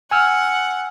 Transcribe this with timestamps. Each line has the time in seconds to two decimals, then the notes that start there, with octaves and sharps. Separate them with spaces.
0.11 F#5 G#5 E6 F6